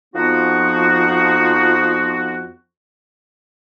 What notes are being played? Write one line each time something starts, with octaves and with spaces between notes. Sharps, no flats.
F2 F3 B3 D#4 F#4